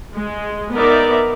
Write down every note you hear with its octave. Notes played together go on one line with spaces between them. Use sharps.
G#3
B3 D#4 A#4 D5 E5